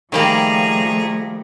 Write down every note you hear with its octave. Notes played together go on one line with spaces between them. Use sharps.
D#3 F3 G3 A3 A#3 G#4 A#5